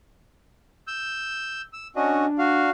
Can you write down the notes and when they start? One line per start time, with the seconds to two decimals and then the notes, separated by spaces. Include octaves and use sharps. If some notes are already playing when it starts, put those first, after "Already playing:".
0.88 E6 G6
1.73 E6
1.96 C#4 D4 F#4 D#5
2.39 F#4 F5